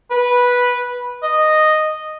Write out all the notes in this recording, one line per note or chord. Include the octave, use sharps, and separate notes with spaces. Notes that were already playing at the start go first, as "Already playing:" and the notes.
B4
D#5